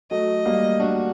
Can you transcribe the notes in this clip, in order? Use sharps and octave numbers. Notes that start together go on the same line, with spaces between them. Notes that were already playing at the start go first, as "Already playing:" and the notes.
F#3 A3 D#5
G3 A#3
A#3 D4 F#4